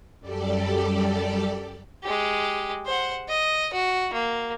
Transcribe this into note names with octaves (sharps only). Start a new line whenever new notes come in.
F#2 G3 G4 A4 D5
G#3 G4
C5 F#5
D#5
F#4
A#3